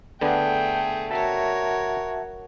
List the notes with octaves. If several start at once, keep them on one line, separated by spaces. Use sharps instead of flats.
D3 A3 B3 D4 G#4 G5
F#4 A#4 C#5 E5 A5